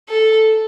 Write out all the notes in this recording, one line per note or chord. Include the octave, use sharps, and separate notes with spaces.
A4